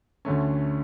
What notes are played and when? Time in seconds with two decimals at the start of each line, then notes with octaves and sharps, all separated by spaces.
0.25 D2 D3 A3 C#4